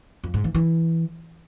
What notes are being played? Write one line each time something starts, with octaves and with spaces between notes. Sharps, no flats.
F2
G#2
E3
E3